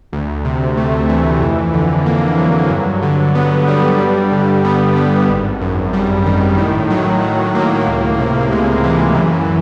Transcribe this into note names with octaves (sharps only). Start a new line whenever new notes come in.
D2
C3
A3
E3
F2
D3
A#3
F#3
G2
D3
B3
G3
G2
D3
B3
G3
G#1
F#2
G3
D#3
A2
F#3
A2
A#3
C#2
C3
G#3
E3
F#2